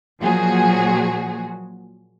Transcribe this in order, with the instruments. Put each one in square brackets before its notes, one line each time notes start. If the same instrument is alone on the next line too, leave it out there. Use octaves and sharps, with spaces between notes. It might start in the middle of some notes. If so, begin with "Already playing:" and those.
[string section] A#2 F3 F#3 F#4 G#4